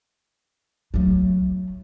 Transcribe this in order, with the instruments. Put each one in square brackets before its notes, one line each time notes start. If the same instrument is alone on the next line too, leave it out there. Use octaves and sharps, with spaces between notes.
[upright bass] F#3 A3